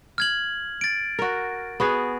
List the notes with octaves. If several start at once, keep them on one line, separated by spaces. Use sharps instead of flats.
F6 G#6 F#7
A6 D7
F#4 A#4
B3 F#4 G#4